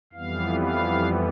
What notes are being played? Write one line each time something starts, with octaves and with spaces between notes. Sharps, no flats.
F2 E3 G3 B3 F5
F5